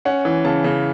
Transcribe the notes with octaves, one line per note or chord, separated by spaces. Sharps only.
C#4 F#5
E3
C#3 A5
C#3